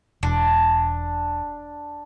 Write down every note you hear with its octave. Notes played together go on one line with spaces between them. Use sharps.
E1 D4